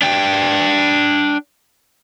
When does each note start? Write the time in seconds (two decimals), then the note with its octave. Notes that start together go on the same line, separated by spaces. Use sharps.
0.02 D4 G5